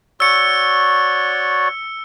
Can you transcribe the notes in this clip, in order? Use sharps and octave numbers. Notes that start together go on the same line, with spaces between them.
F#4 C#5 D5 E6 C#7